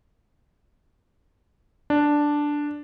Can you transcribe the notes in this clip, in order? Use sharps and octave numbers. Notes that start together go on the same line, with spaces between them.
D4